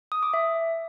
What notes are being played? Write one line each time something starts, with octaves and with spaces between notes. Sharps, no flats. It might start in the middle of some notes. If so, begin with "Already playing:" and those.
D#6
D6
E5